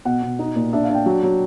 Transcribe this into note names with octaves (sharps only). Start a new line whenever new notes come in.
B2 F#5
B2
D#4
A#2
D4 E5
F5
D4
G5
F#3
F#3